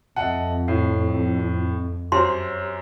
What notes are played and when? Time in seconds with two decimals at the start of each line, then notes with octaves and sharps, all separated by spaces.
0.16 F2 D#5 E5 F#5 A5
0.68 A2 C7
2.12 F#2 F#3 G4 C5 C6